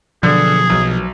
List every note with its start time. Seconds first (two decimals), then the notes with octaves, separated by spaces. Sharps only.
0.23 B2 D3 F3 F#3 G#4
0.70 B1